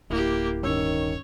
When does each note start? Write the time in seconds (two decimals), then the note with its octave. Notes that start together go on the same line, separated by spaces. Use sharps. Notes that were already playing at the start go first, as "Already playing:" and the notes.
0.10 D1 A#3 E4 G4
0.63 G2 D#3 C#4 C#5 E6